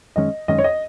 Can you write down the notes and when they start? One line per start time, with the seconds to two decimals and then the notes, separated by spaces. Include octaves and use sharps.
0.16 F#2 D#3 G#3 C#4 D#5
0.48 F#2 D#3 G#3 C#4 D#5
0.58 C#5
0.64 D#5